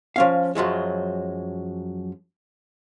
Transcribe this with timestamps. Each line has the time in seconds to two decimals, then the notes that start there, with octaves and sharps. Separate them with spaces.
0.16 F3 C#4 F5
0.55 F#2 F3 F#3 G#3